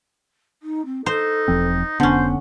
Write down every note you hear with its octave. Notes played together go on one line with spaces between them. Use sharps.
D#4
C4
D#4 A4 C5
E1 F3 C4
F1 D3 B3 C#4 C5 F#5